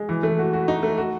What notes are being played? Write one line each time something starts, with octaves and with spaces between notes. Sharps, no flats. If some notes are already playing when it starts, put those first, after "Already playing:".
Already playing: G#3
E3
A3
F#4
F#4
D#4
A3
F#4